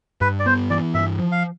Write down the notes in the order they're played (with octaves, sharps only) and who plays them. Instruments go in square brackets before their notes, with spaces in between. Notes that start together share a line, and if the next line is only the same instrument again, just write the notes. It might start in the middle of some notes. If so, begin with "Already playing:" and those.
[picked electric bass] G2 [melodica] B4
[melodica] D5
[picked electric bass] B3 [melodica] C5
[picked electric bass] E3 [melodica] D5
[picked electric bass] G2 [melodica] E5
[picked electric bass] F3
[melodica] F5